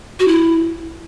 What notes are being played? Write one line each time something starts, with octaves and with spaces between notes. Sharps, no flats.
F#4
E4